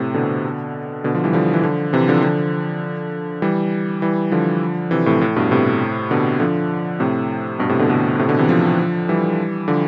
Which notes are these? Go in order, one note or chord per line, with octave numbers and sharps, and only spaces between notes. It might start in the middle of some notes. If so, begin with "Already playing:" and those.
Already playing: A2 C3
B2 D3
B2 D3
D3 F3
E3 G3
D3 F3
E3
D3 F3
C3 E3
D3 F3
D3 F3
E3 G3
E3 G3
D3 F3
C3 E3
A2 C3
A2
G2 B2
A2 C3
B2 D3
D3 F3
A2 C3
G2 B2
A2 C3
B2 D3
B2 D3
A2 C3
B2 D3
C3 E3
D3 F3
E3 G3
D3 F3